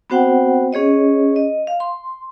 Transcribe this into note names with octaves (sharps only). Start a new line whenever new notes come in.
B3 C4 F#4 C5 F#5 G5
C#4 G#4 C#5 D#5
D#5
F5
C6